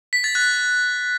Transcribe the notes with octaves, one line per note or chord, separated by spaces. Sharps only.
B6
A6
F#6